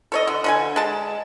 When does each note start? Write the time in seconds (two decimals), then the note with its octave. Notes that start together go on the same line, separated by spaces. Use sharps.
0.12 A4 C#5 D#5
0.27 D3
0.44 D3 F3 G#5
0.76 G#3 A5